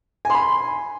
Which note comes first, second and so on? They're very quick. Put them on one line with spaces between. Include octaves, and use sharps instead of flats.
G#5 C6 B5